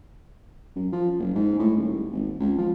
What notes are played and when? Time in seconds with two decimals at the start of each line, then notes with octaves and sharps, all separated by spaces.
0.76 F#2
0.93 F3
1.19 F#1
1.35 G#2
1.59 A2
1.77 D#1
2.12 G#1
2.40 C#2
2.58 F3